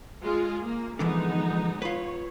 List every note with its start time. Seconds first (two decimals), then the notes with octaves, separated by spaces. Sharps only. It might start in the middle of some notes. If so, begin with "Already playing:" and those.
0.24 G#3 F4 G#4
0.64 A#3
0.99 D3 E3 F3 G#3 B3 D#4
1.82 F4 B4 C#5